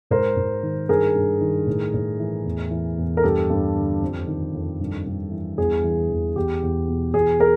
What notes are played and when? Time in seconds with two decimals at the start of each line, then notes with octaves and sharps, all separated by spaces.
0.10 G#2 A#4 C5
0.36 G#2
0.63 D#3
0.89 G2 G#4 A#4
1.15 G2
1.41 D#3
1.66 A2
1.94 A2
2.20 E3
2.45 E2
2.71 E3
2.97 E2
3.17 A#4
3.23 G2 G4 A4
3.50 G2
3.75 D3
4.02 F2
4.27 D#3
4.54 F2
4.80 G2
5.06 G2
5.31 E3
5.58 E2 G#4
5.84 E3
6.10 E2
6.36 E2 G4
6.63 E2
6.88 B2
7.14 E2 G#4
7.40 G#4 A#4